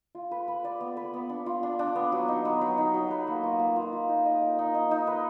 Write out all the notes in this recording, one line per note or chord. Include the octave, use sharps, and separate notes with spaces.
F4
B4
B4
D5
B3
B4
B3
D4
F4
D4
D4
B3
F#3
D#4
B3
F#3
D#4
F#3
B4
A#3
F4
A#3
F4
F4
D#4
D#5
A#4
D#4
D#4
D#4
B4